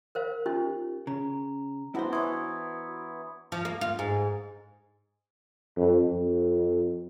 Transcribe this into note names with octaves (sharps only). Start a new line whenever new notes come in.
A#4 C5 F5
C#4 D#4 F4 G4
C#3 A#5
B3 D4 E4 F#4 C5
E3 C#5 C6 D#6 G#6
F3
A#3
F4
G#2
F2
F2